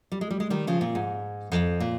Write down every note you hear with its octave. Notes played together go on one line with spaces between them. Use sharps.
G3
G#3
G3
G#3
D#3 G3
C#3 F3
A#2
G#2
F2
A#2